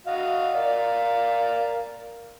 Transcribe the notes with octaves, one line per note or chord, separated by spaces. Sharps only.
F#4 D#5 F5
A#4 D5 F5